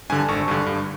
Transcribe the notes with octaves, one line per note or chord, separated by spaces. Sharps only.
G2 D3 G#5
A5
G#1 C#6
G2 D3
G2